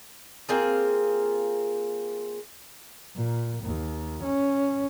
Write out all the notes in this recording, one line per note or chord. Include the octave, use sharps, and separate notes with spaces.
A#3 C4 F4 G#4
A#2
D#2
C#4